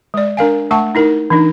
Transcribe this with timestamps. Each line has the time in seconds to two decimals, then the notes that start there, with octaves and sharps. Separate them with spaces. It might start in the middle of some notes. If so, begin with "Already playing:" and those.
0.14 G#3 D5
0.37 D4 A#4 F5 G#5
0.71 A3 F#5 A5 C#6
0.95 D#4 E4 A#4
1.30 E3 D4 D#4